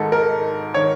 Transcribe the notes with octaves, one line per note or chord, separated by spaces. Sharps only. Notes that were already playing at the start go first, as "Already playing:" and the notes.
Already playing: G#1 G#2 D#3 A4
A#4
D#3 C#5